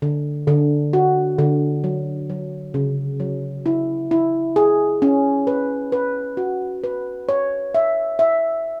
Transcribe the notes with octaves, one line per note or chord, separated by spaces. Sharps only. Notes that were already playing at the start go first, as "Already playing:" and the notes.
D3
D3
F#4
D3
F#3
F#3
C#3
F#3
E4
E4
G#4
C#4
B4
B4
F#4
B4
C#5
E5
E5